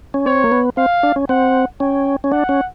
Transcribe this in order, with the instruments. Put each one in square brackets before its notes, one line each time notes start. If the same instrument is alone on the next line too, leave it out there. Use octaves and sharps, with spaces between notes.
[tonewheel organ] C#4
[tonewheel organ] C4 [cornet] C#5
[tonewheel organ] A#3
B3
[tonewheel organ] C4 [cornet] F5
[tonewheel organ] D4
C#4
[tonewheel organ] C4 [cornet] F#5
[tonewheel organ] C#4 [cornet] G5
[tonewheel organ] C#4
[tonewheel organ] D4 [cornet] F#5
[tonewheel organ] C#4